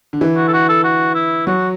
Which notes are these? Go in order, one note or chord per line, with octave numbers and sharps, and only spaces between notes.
D3
E3
F#4
A4
F#4
A4
F#4
E4
F#3 F#4